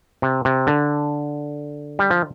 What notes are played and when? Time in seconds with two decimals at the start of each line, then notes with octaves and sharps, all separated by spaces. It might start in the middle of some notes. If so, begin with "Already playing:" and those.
0.22 C3
0.45 C3
0.67 D3
1.99 G3
2.10 F3